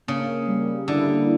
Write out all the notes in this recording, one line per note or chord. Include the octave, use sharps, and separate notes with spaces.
C#3 A#3
G3
D3 E4